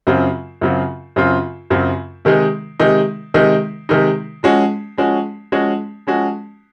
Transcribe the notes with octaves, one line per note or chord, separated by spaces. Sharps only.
F#2 C#3 F#3 C4 F4
F#2 C#3 F#3 C4 F4
F#2 C#3 F#3 C4 F4
F#2 C#3 F#3 C4 F4
C3 D#3 G#3 D#4
C3 D#3 G#3 D#4
C3 D#3 G#3 D#4
C3 D#3 G#3 D#4
F3 G#3 C#4 F#4
F3 G#3 C#4 F#4
F3 G#3 C#4 F#4
F3 G#3 C#4 F#4